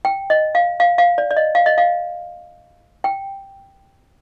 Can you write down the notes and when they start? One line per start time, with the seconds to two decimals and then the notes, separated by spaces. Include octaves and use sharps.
0.05 G5
0.30 D#5
0.55 F5
0.80 F5
0.98 F5
1.18 D5
1.31 D5
1.37 D#5
1.55 F5
1.66 D#5
1.78 F5
3.04 G5